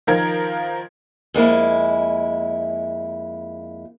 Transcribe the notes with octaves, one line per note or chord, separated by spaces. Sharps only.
D#3 F3 A#4 G#6
F2 G#3 A#3 E4